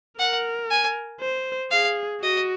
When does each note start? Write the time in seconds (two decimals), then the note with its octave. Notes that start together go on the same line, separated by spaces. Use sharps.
0.19 A#4 F#5
0.70 G#5
1.21 C5
1.71 G#4 F5
2.22 F#4 D#5